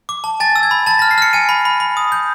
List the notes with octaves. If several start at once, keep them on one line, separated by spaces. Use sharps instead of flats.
D6
A5
G#5 A6
E6
G#6
B5
A5 A6
F6 A#6
C7
F6 C#7
G#5 D#7
B5
B5
B5
D#6
G6